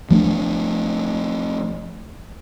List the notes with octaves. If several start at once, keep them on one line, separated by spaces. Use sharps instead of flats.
F3 A3 C#4 D4